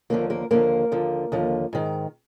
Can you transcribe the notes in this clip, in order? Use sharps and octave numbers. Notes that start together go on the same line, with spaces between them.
D#2 D3 F3 A#3 A#4
A#3 A#4
D#2 D3 F3 A#3 A#4
D#2 D3 F3
D#2 D3 F3
G#2 D#3